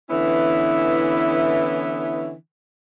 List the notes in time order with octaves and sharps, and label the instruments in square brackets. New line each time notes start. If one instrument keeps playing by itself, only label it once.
[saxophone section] D3 E3 B3 C#4 E4